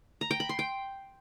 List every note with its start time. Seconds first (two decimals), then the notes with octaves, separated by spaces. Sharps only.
0.21 A#5
0.31 G5
0.40 B5
0.49 C6
0.59 G5